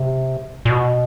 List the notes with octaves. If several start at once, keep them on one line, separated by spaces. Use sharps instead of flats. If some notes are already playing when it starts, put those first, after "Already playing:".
Already playing: C3
A#2
B2